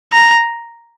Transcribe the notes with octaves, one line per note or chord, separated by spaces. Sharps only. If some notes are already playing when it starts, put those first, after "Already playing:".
A#5